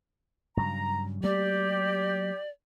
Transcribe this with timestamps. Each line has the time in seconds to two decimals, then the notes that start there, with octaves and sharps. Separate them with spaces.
0.57 G2 C#3 F#3 A#5
1.23 F#3 A3 A#3 G4 D5